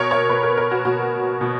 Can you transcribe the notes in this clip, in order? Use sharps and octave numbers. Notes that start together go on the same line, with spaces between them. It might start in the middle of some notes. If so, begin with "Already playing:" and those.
Already playing: B2 A#4 C#5
C#5
B2 B4
A#4
A#4
F#4
B2 F#4
B2